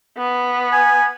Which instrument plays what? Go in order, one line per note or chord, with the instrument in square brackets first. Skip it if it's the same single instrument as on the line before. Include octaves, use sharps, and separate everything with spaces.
[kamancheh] B3
[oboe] G#5